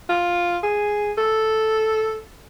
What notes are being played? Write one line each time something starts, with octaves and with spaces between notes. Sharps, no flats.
F4
G#4
A4